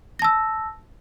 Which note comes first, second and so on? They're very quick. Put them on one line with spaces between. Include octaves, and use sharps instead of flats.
A#6 A5 E6